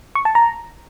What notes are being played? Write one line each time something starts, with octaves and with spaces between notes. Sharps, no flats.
C#6
A5
A#5